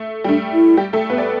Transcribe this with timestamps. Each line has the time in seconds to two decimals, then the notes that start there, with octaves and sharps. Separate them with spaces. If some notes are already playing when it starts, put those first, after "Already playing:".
Already playing: A3
0.24 G3
0.28 A3 D4
0.53 E4
0.77 G3 G4
0.93 A3 A4
1.09 B3 B4
1.18 D5